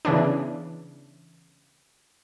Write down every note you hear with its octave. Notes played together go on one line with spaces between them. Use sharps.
C#3 E3 B3 D4